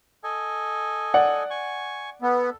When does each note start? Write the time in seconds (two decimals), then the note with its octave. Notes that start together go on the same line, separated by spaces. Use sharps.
0.24 A4 D#5 G#5
1.14 D5 F#5
1.50 G#5 C#6
2.22 B3 A4